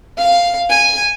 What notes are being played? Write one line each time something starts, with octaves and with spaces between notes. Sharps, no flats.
F5
G#5